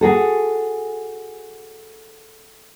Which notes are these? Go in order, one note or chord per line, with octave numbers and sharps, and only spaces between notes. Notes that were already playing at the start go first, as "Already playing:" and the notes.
F#4 G#4 A4